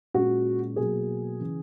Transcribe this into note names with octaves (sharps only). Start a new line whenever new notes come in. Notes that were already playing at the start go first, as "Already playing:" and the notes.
A#2 G#3 C#4 F#4
B2 F#3 A#3 G#4
C#3 E3